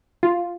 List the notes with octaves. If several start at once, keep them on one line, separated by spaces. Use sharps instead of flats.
F4